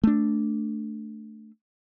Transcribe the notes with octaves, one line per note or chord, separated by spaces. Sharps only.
A3 D4